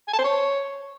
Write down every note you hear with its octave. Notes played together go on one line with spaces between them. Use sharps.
G#5
A5
C5
C#5